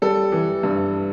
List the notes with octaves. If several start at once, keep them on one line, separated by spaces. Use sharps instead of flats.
G3 A4
E3
G2